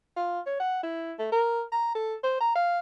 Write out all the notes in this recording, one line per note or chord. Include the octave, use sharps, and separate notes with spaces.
F4
C#5
F#5
E4
A3
A#4
A#5
A4
C5
A#5
F5